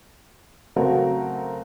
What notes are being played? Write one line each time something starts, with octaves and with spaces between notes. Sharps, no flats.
C#3 F#3 A3 C4 F#4 A#4